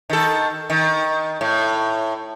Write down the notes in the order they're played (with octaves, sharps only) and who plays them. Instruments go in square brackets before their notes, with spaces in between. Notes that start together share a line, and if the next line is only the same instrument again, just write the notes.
[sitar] D#3 A4
D#3
A2